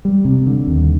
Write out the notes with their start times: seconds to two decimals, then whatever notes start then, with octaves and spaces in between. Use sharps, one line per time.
0.05 G3
0.25 C3
0.46 D3
0.67 D#2